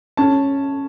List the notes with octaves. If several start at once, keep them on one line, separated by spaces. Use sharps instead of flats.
C#4 A5